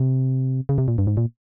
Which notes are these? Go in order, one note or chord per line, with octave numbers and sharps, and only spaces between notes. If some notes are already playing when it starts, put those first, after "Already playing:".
Already playing: C3
C#3
C3
A#2
G2
G#2
A#2